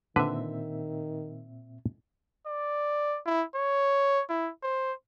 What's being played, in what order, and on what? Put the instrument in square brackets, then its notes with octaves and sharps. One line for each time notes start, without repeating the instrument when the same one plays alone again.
[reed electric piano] A#2 C4 E5 [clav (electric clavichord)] D3 B4 [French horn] D#3
[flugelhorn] D5
E4
C#5
E4
C5